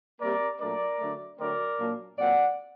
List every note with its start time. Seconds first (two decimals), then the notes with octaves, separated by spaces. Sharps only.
0.20 C3 G3 A#3 A#4 D5
0.59 A#2 F#3 A3 D4 A#4 D5
1.00 D3 F#3 A3
1.38 D3 F#3 A3 C4 A#4 D5
1.78 A#2 F#3 A#3 D4
2.18 A#2 F#3 C4 D5 F#5